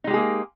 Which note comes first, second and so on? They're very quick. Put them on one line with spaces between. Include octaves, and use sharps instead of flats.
D#4 G#3 G4 G#4 A#3